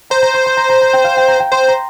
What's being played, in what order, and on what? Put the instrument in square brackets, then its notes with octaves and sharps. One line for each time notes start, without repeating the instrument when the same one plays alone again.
[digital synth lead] C5 [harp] A#5
[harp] A#5
C6
C6
A#5
A#5
A#5
G5
F5
G5
A#5
G5
[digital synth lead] C5 [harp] C6
[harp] A#5